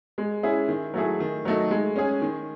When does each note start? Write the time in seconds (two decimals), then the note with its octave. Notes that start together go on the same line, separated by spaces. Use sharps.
0.18 G#3
0.43 C#4 E4 G#4
0.68 D#3
0.94 F#3 A3 E4 G#4
1.20 D#3
1.45 F#3 A3 D#4
1.71 G#3
1.96 C#4 G#4
2.21 D#3